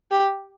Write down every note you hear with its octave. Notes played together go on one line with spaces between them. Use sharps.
G4